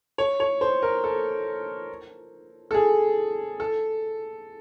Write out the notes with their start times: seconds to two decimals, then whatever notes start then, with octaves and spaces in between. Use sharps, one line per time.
0.18 C#5
0.40 C#5
0.61 C5
0.82 A#4
1.04 A4
2.71 A4
2.74 G#4
3.60 A4